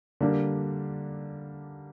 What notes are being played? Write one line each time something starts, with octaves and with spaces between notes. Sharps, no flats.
D3 G3 A#3 D4